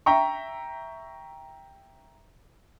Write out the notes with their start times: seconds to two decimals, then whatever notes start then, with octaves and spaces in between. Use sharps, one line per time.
0.06 E5 G5 A#5 C#6